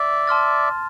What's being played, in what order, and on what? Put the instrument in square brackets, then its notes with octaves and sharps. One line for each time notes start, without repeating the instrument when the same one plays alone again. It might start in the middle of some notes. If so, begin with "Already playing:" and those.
Already playing: [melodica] D5 E5
[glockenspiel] A5 C6 F6 A6